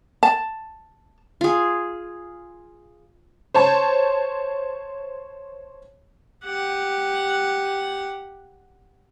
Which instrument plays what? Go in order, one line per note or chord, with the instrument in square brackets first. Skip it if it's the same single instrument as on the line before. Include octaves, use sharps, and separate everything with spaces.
[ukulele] A5
[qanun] F4 G#4
[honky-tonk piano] C5 C#5 A5
[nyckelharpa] G4 F#5